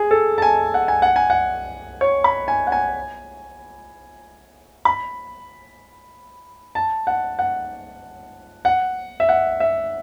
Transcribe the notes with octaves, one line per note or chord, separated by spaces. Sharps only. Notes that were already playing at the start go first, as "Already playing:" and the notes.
Already playing: G#4
A4
A5
G#5
F#5
G#5
F#5
G#5
F#5
C#5
B5
G#5
F#5
G#5
B5
A5
F#5
F#5
F#5
E5
F#5
E5